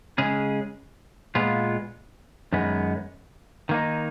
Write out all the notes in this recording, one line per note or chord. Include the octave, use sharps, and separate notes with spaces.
C#3 G#3 C#4 G#4
A#2 G#3 B3 F4
F#2 D#3 G#3 B3
D#3 A#3 D#4